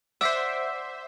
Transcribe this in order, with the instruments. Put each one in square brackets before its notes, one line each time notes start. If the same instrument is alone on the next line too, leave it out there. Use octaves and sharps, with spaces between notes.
[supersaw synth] C5 E5 [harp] D5 F#5 D6 [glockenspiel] E6 B6